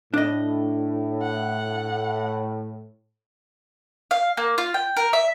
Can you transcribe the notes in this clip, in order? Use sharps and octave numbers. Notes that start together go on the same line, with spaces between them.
A2 D4 D#5
F#5
F5
A#3
F4
G5
A#4
E5